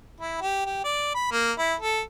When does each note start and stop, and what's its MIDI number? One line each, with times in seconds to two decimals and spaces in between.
0.21 0.38 64
0.41 0.64 67
0.66 0.82 67
0.84 1.12 74
1.15 1.29 83
1.31 1.53 58
1.58 1.74 64
1.80 2.01 69